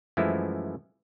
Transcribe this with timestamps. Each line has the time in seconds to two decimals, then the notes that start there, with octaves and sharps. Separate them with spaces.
0.17 F#2 E3 F3 G#3 A3 E4